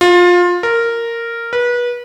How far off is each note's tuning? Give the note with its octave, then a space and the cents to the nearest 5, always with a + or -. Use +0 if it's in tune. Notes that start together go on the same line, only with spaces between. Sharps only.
F4 +20
A#4 -10
B4 -30